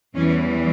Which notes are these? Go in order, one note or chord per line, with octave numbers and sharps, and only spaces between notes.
E2 E3 G3 C#4